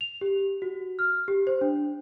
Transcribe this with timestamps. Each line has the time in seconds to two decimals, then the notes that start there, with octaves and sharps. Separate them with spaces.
0.01 F7
0.21 G4
0.62 F#4
0.99 F6
1.28 G4
1.47 C5
1.61 D4